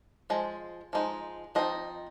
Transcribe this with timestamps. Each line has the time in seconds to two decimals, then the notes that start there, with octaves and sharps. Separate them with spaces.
0.30 F3 G#3
0.93 F3 G#3 D#4
1.55 F3 C4 D#4 D#5